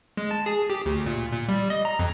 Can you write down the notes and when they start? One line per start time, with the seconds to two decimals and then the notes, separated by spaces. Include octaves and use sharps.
0.17 G#3
0.31 A5
0.46 G#4
0.70 G4
0.86 D2
1.06 A#2
1.33 A#2
1.49 G3
1.70 D#5
1.85 A#5
1.99 F2